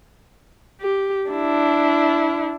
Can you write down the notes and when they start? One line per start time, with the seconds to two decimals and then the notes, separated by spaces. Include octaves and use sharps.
0.81 G4
1.30 D4 E4